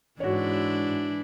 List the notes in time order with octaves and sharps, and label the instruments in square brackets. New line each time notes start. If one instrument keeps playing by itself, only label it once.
[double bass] G#2 [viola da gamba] E3 D4 E4 [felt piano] F#4 C#5